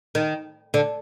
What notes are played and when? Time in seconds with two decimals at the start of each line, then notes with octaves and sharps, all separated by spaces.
0.15 D#3
0.74 D3